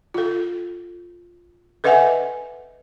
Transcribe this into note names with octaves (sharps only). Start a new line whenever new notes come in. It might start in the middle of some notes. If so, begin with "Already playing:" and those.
F4 A4
A4 B4 D#5 E5 F#5 G#5